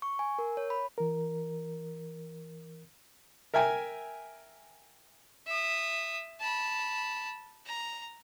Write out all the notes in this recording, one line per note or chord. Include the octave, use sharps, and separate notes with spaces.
C#6
G#5
A#4
C#5
B5
E3 A#4
A#4 E5 G5 G#5
E5 D#6
A5 B5
A#5